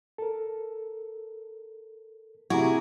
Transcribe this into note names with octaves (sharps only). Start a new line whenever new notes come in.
A4 A#4
C3 E4 F#4 G#4 A#5 D6 G#6